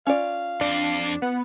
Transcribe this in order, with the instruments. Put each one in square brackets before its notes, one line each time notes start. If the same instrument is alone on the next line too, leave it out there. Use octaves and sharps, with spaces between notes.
[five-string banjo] C#4 F4 D5 [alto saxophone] F5
[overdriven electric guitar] F2 C4 [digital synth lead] D4
[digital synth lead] B3 [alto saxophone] F#5